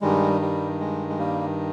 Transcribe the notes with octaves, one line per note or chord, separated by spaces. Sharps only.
G2 D#3 G3 G#3
G3
G#3
G#3
G3 A#3